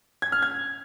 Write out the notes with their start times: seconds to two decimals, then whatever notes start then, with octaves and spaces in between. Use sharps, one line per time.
0.22 G#6
0.32 F6
0.42 G#6